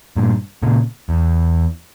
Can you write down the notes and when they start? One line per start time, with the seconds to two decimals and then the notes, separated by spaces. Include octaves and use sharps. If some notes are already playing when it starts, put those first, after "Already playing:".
0.16 G2 A#2
0.63 A#2 C#3
1.09 E2